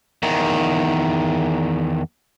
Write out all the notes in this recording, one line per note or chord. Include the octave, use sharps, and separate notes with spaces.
E2 D#3